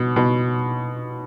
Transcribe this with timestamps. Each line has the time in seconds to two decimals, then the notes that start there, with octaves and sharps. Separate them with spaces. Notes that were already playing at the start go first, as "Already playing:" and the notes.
Already playing: B2
0.16 B2